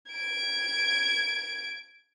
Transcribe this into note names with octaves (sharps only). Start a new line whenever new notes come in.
G#6 D7